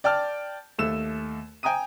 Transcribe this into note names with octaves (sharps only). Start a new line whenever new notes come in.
D5 G5 A5 F6
D#2 A3 E6 E7
G5 G#5 A#5 D#6 D#7